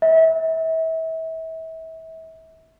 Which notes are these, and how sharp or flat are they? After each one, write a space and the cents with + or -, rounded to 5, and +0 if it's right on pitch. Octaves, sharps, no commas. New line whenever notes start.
E5 -35